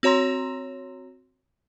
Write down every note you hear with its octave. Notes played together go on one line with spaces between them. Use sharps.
C4 F#4 C#5 A#5 C6